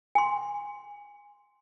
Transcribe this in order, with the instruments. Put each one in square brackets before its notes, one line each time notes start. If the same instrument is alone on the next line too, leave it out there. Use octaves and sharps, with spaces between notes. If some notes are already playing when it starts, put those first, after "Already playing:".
[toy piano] G#5 C6